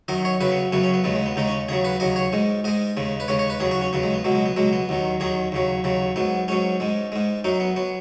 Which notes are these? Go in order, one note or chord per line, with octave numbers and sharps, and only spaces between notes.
F#2 D#3 F#3 D#5
C#5
F#2 C#3 F#3 B4
B3
F#2 C#3 F#3 B3
C#4
B3
D#2 C#3 G#3 B3
G#3
B3
D#2 C#3 G#3 D#4
C#4
D#2 C#3 F#3 G#4
B4
D#2 C#3 F#3 D#5
C#5
G#2 G#3
G#2 G#3 D#5
D#2 C#3 G#3
B4
D#2 C#3 G#3 C#5
C#5
B4
D#2 C#3 F#3 G#4
F#4
C#4
D#2 C#3 F#3 B3
G#3
B3
C#2 B2 F#3 G#3
G#3
B3
C#2 B2 F#3 G#3
B3
D#2 D#3 F#3
D#2 D#3 F#3 G#4
D#2 C#3 F#3
D#2 C#3 F#3
G#2 F#3 B3
G#2 F#3 C#4
G#2 G#3
G#2 G#3
F#2 F#3 D#4
B3
F#3 B3